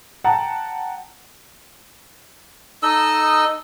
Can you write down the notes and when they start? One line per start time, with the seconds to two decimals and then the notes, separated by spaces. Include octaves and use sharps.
0.24 F#5 G5 A5 A#5
2.83 D#4 A4 D#5 E6